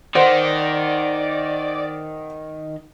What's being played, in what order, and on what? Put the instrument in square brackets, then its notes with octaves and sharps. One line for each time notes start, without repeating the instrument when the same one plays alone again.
[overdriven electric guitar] D#3 [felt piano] C5 F#5 [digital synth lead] D5